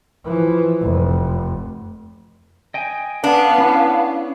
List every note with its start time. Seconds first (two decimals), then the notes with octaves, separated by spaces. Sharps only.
0.24 E3 F3
0.82 F1 F2
2.74 D#5 G5 G#5
3.24 B3 D4 F5
3.58 C#4 E4